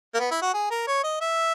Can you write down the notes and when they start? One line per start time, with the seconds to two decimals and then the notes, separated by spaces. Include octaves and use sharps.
0.15 A#3
0.20 B3
0.31 E4
0.42 F#4
0.54 G#4
0.71 A#4
0.87 C#5
1.04 D#5
1.21 E5